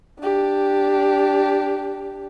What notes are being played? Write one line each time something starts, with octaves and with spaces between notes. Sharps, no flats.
D4 G4